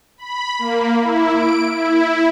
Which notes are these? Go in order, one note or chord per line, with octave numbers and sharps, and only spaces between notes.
B5
A#3
E4
D7
E4